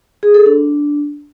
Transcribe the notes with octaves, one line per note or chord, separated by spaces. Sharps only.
G#4
A4
D4